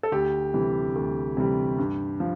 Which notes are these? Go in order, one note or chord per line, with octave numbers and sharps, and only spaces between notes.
A4
D2 G4
C3 E3 G3
D2
C3 E3 G3
G2
F3